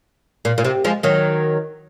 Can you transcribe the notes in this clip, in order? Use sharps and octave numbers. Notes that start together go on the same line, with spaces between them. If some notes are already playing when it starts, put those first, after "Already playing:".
A#2
A#2
C3
F3 G#3
D#3 F#3